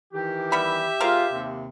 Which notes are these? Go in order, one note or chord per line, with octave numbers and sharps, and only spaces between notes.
D#3 E3 G4
G3 B3 E5 B5
G#3 F4 A#4 C5 F5
D#2 C3